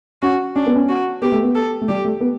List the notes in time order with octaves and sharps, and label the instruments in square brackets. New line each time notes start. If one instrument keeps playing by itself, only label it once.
[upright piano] C#4 [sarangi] F#4
[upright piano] C#4 [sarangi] D4
[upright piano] B3
C#4
[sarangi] F#4
[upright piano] B3 [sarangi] G4
[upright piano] A3
B3
[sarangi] A4
[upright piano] A3
[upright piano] G3 [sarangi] G4
[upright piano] A3
B3